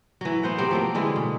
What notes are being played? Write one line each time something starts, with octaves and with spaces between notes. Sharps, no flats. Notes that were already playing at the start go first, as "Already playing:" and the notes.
E3 F#3
B3 C5 F#5
C3 F#3 C4
F3 F#3 A#3
D3 E3 G#3 E4
B2